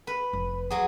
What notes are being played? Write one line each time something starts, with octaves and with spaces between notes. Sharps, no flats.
B4
F1 F3
D#2 F#3 G#4